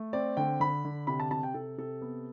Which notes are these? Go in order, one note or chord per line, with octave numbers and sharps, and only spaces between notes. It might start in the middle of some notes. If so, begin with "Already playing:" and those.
Already playing: A3
C4 D5
D3 G5
D3 B5
D3
C3 B5
A5
C3 A5
G5
C3 A4
C3 A4
B3